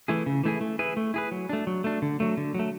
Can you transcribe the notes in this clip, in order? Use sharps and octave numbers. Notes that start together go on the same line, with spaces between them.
E3 A3 E4 G#4
C#3
E3 A3 E4 G#4
A3
E4 G#4 B4
A3
E4 G#4 B4
F#3
A3 D4
F#3
A3 D4
D3
F#3 A3
D3
F#3 A3